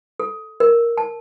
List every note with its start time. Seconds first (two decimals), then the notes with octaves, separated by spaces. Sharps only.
0.20 A4
0.60 A#4
0.97 A5